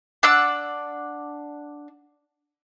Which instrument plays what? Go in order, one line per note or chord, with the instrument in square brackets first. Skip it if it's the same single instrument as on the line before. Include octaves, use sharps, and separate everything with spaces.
[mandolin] D4 D5 F#5 E6